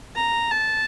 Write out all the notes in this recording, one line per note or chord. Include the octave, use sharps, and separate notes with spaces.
A#5
A5